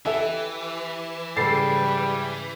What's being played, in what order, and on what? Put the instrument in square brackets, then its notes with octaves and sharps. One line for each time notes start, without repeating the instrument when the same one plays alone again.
[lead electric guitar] E3 [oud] E4 G4 [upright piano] A4 E5
[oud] G#2 C#3 G#3 [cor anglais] G3 [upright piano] A4 A6 C7